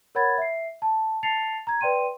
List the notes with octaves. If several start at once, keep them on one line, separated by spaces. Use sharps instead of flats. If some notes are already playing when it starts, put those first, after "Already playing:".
A#4 C#5 F#5 B5 G#6 A6
E5 C7
A5
A5 A6 C7 C#7 F7
A#5 G#6
B4 D5 G5 C6 D#7